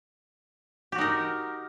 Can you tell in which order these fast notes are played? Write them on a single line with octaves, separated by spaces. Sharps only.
G4 F#4 D#4 A#4